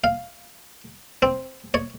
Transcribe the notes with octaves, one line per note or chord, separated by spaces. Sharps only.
F5
C4
C#5